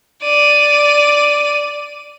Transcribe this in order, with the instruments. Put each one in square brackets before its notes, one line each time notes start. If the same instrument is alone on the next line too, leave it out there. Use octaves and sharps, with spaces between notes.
[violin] D5 D#7